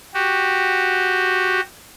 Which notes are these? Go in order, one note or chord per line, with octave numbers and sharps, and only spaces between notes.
F#4 G4